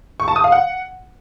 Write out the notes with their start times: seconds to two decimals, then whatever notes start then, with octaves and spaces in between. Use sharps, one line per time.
0.20 C#6
0.28 A5
0.36 D#6
0.44 F5
0.52 F#5